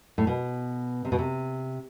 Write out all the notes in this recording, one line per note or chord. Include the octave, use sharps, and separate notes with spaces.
A2
B2
C3
B2
C3